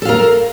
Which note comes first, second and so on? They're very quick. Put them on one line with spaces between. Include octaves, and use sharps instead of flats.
A4 F5 A#4